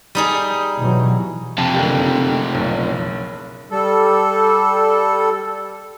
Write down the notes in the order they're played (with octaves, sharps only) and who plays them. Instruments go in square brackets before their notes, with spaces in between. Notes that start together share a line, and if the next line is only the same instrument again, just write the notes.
[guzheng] G3 D#4 G#4
[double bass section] B2 E3 F#3
[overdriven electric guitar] F2 C3 [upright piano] A5
[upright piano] F#1 D3 G4
F#1 B1
[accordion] G3 A4